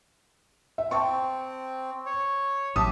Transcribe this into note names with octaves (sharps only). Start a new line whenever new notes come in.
E5
C4 G5 A5 C#6
C#5
A1 F#3 G4 E5 A5 D#6